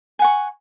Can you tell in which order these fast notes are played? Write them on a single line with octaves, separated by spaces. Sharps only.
G#5 F#5 C#6